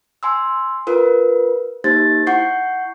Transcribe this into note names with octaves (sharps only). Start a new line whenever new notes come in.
G#5 C6 E6
F4 A#4 B4
A#3 D#4 G4 C5 A6
E4 F#5 C#6 G6 C7